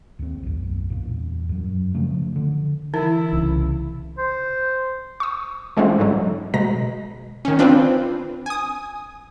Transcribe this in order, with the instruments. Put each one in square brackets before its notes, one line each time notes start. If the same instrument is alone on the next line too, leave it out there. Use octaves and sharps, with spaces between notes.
[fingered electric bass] D#2 C4
B1 F#2
E2 A#2
F#2 F#3
C#3 F3 A3
D3
[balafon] E3 D#4 [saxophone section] E4
[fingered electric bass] C2 C#3
[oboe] C5
[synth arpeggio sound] C#6 D#6
E3 G#3 A3 C4 C#4 F4
G#2 D3 F#3
B2 G#3 A#5 A#6
[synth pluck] D#3 C#4
C4 D4 F4 B4
G#5 D#6